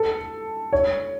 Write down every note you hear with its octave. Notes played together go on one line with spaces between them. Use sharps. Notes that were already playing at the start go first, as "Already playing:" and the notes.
Already playing: A4
C#5